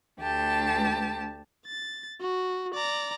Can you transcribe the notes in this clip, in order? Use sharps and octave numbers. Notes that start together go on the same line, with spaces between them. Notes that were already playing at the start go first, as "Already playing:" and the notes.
D2 G4 A5
A6
F#4
D5 A#5